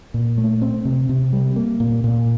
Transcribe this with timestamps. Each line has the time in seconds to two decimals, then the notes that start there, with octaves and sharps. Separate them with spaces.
0.14 A#2
0.38 A3
0.62 C4
0.85 C3
1.09 C3
1.33 G3
1.56 A#3
1.80 A#2
2.04 A#2